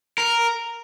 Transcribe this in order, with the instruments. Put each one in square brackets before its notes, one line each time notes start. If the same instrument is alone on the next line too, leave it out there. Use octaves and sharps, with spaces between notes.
[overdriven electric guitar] A#4